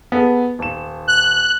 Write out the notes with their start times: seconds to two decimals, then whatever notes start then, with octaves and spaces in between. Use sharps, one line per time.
0.12 B3 G#4 A4
0.59 D#1 E7
1.08 F#6